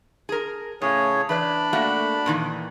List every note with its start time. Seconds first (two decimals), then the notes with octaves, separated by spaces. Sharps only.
0.29 G#4 A#4
0.82 A2 C#3 G#4 C#5
1.29 E3 D4 B4 D5 B5
1.73 A3 A#3 F#4
2.26 A#2 D#3 E3